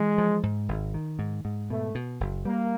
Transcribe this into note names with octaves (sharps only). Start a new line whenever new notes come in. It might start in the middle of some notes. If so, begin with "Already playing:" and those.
Already playing: E3 G#3
F3
G#2
G#1
D#3
G#2
G#2
B2 A3
B2
F#1
G3 A#3